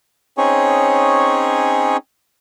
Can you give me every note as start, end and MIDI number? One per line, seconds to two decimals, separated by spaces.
0.38 1.97 60
0.38 1.97 61
0.38 1.97 63
0.38 1.97 68
0.38 1.97 73